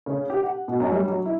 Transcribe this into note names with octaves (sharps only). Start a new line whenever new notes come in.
C#3
G4
F#5
B2
F#2
G3
F#3
E4